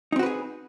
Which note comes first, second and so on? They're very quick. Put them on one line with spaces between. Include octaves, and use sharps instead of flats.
D#4 C4 F#4 B4 G#4